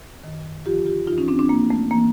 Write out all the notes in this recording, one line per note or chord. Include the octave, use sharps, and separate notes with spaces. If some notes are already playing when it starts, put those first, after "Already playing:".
F#2 D#3
D#2 D3 F3 F4 G4
F4 G4
G2 E3 D#4 F4
C#4 D#4
C4 D4
C4 D4
G#2 F3 A#3
A3
E3 A#3